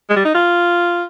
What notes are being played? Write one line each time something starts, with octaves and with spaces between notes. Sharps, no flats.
G#3
G3
D#4
F4